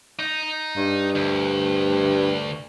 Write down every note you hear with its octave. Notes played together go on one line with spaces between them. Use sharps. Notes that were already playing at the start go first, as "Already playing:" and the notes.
D#4
G2
D2